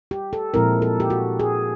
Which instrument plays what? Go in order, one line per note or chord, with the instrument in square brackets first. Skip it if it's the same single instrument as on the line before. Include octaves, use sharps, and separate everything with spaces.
[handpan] G4
A4
A#2 F3 G#3 C4 E4 A#4
A4
G4
F#4
G#4